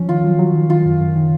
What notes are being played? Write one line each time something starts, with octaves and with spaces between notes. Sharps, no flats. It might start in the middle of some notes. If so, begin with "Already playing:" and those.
Already playing: F3 C#4
D#3 F4
F#3
F#3
D#3
D#3 F4
F#2
F#2
D#3